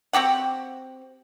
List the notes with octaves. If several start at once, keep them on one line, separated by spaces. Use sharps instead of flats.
C4 F#4 G4 F#5